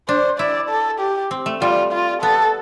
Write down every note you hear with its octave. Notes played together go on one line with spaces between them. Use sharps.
D4 C5
E4 D5
A4
G4
C4
A3
G3 F4
F4
B3 A4